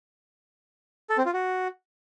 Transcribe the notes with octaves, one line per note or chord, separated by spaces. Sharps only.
A4
C4
F4
F#4